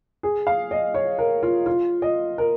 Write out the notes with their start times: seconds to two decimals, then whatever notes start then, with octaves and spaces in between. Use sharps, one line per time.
0.23 G#4
0.47 F5
0.71 D#5
0.94 C#5
1.19 A#4
1.43 F4
1.66 F4
2.02 D#5
2.38 A#4